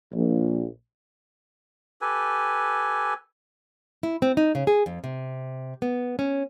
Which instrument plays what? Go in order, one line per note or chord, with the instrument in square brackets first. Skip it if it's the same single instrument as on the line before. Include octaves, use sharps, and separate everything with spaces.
[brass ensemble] A#1
[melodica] G4 A4 B4 G#5
[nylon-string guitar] E4
C4
D#4
C#3
G#4
F2
C3
B3
C#4